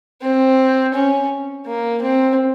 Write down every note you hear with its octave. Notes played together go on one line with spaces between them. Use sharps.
C4
C#4
A#3
C4